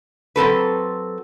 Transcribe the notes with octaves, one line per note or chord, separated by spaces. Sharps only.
F#3 C4 A4 B4